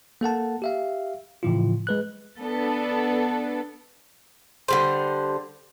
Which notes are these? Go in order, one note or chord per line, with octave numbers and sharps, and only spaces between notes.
A#3 A4 F#5 A5
G4 E5 F5
A2 C#3 E3 F3 E4 F4
G#3 B4 F#6
B3 D4 A4 B4
D3 G3 C5